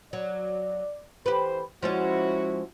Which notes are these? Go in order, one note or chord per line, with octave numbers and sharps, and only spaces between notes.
F#3 D5
E3 G4 B4 C5
F3 G#3 C#4 E4 F#4